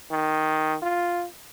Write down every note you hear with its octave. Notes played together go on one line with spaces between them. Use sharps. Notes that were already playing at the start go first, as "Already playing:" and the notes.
D#3
F4